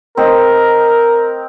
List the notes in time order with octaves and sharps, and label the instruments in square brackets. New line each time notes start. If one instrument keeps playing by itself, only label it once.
[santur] C4 D#5 [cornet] A#4